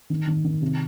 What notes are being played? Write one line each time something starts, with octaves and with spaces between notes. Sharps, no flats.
D#3
D#3
D#3
C3